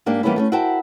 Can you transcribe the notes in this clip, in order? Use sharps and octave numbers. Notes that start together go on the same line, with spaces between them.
G#2 A#3 D4 G4
E3 G3 A#3 B3 C#4 E4
A3 A#3 C#4
E4 F#4 A#4 C5 G5 A5